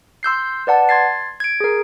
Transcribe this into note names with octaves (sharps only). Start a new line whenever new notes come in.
C6 E6 G6 C7
B4 D5 F#5 A5
C6 G#6 A6 C7
G#6 D7
G#4 A#4